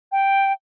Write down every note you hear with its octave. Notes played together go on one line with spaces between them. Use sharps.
G5